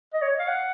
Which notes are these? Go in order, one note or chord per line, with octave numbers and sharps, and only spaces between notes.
D#5
C#5
F5
F#5